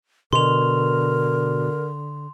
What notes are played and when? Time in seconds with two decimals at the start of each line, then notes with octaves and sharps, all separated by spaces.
0.33 B2 D3 A#4 C6 F7